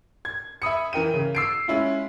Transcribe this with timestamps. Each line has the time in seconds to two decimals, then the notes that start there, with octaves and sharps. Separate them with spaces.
0.25 G#6
0.62 E5 B5 D#6 C#7
0.93 E3 A#4 G5 D#7
1.14 C#3
1.35 E6 C7 D7
1.68 G#3 C#4 E4 F4